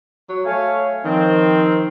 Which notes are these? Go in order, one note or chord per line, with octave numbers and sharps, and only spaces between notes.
F#3
A3 C#5 F5 G#5
D#3 F3 C4